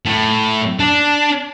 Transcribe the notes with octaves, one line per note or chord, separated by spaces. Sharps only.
A2
D4